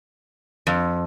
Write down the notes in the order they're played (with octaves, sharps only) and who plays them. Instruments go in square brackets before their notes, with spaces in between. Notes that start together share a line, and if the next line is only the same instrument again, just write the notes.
[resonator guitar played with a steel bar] F2